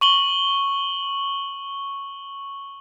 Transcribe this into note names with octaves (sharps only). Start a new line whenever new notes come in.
C#6 F#7 G7